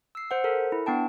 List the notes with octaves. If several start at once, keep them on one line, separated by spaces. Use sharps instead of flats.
E6 C7
C5 F#5
A4 A#4
E4
B3 D4 G5 A5